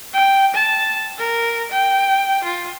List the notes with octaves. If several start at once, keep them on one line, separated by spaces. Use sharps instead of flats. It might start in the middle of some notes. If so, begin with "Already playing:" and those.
G5
A5
A#4
G5
F4